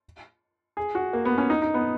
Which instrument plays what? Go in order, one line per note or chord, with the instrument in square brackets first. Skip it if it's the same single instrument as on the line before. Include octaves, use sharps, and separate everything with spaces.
[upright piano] G#4
F#4
A#3
B3
C#4
D#4
D#4
B3